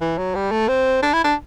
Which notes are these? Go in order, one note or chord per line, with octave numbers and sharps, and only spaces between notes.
E3
F#3
G3
A3
C4
D4
E4
D4